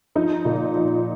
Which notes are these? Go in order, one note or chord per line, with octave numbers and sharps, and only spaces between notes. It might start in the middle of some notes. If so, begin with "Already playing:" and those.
F3 D#4
A#2
F3